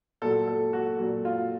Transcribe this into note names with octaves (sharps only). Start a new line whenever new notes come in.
A#2 F#3 A4
A4
F#4
A#2 F#3 F#4
F4